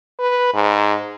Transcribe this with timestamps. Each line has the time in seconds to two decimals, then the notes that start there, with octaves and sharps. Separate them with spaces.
0.20 B4
0.54 G#2